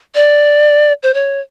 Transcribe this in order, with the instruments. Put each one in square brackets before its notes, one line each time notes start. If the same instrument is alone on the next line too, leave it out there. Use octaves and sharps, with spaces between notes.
[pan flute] D5
C5
C#5